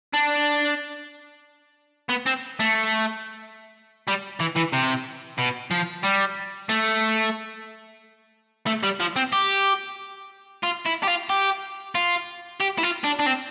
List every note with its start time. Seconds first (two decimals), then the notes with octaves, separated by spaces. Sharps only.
0.13 D4
2.10 B3
2.27 C4
2.60 A3
4.08 G3
4.40 E3
4.56 E3
4.73 C3
5.38 B2
5.71 F3
6.04 G3
6.69 A3
8.66 A3
8.83 G3
9.00 F3
9.16 C4
9.33 G4
10.64 F4
10.86 E4
11.03 G4
11.08 F4
11.30 G4
11.95 F4
12.60 G4
12.78 E4
12.83 F4
13.04 D4
13.19 D4
13.26 C4